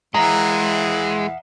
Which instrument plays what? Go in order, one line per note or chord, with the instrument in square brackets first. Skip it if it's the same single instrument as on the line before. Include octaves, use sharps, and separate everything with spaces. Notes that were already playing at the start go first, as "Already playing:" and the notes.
[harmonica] E3 [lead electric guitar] G#3 [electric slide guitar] D#5 E5 F#5 [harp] A#5